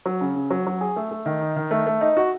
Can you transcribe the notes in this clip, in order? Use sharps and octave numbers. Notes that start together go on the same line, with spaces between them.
F#3
C#3
C#3
F#3
F#3
G#4
A3
A3
D#3
D#4
D#3
A3
A3
D#4
F#4